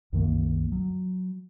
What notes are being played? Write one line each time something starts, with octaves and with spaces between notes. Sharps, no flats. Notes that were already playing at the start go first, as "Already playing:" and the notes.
C2 F#2 D#3 A#3
F#3